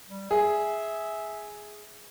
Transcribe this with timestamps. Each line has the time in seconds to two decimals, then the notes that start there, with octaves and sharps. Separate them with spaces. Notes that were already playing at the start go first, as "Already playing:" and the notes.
0.09 G3
0.31 G#4 E5